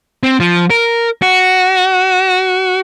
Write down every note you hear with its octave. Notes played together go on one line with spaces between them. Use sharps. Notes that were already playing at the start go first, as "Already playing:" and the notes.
C4
F3
A#4
F#4